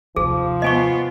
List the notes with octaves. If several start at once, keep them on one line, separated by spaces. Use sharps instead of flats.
D#2 C3 F3 G#4
B3 F4 D#5 G#5 C#6